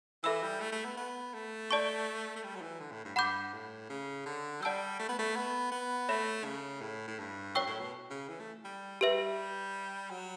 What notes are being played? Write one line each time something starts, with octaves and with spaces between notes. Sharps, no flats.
E3 A4 E5 B5 E6
G3
A3
A3
B3
B3
A3
D5 A5 C#6
A3
G3
F#3
E3
D3
A2
G2
G2 F#5 B5 D6 G6
A2
C#3
D3
G3 D5 F#5 A5 E6 G6
A3
B3
A3
B3
B3
A3 C#5 E5 B5
C#3
A2
A2
G2
F#2 C#5 G5 C#6 E6
A2
B2
C#3
E3
A3
G3
G3 G4 B4 E5
F#3